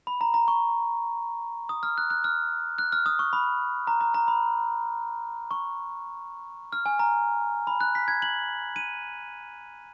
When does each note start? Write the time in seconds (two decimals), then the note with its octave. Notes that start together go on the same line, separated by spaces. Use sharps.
0.07 B5
0.21 A#5
0.34 A#5
0.48 C#6
1.69 D#6
1.83 F6
1.98 F#6
2.10 F#6
2.24 F6
2.78 F#6
2.92 F6
3.06 D#6
3.19 C#6
3.33 B5
3.87 A#5
4.01 A#5
4.14 A#5
4.28 B5
5.51 C#6
6.73 F6
6.86 G#5
6.99 A#5
7.67 B5
7.81 F#6
7.95 B6
8.08 G#6
8.22 F#7
8.76 D#7